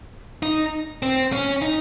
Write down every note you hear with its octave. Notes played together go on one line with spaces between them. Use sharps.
D#4
C4
C#4
D#4